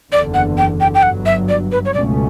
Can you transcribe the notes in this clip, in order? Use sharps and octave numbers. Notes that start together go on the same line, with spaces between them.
F#1 E2 D3 D5
F#5
G5
G5
G5
G1 G2 F#3 F#5
E5
D5
B4
C#5
C#2 B2 A3 C#4 D5